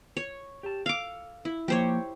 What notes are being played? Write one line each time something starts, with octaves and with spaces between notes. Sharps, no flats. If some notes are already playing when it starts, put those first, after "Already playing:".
C#5
G4 A5
A4 F5 D6
E4
F3 A#3 G4 C5 C#5